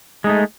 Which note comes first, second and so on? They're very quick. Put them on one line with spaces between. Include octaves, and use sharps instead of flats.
G#3 D#4 A3